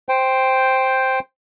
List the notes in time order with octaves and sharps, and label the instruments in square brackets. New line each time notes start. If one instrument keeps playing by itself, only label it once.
[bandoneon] C5 G5